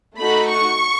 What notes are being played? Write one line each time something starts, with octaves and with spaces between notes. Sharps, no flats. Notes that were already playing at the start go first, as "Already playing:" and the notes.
A3 D#4 F#4 B5
C#6